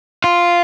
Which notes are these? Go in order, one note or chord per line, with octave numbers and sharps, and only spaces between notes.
F4